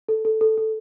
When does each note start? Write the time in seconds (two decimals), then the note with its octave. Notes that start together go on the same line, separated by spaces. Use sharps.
0.08 A4
0.25 A4
0.41 A4
0.58 A4